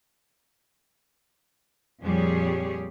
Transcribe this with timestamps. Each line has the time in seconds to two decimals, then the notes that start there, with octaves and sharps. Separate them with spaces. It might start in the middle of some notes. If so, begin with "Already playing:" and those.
2.03 F2 A#2 G3 G4 G#4 C#5